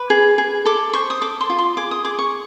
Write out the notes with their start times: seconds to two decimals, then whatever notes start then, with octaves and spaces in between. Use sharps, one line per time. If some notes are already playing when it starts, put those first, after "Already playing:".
Already playing: B4 D6
0.10 G#4
0.38 G#4
0.65 A4 D6
0.93 C5 C#6
1.10 D#6
1.21 A4 D6
1.41 C6
1.50 F4
1.59 C6
1.77 G#4 D6
1.91 D#6
2.05 G#4 D6
2.19 C#6